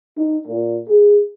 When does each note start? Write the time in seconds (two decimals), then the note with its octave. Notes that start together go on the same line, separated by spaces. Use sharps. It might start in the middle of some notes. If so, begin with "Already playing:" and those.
0.17 D#4
0.47 A#2
0.88 G#4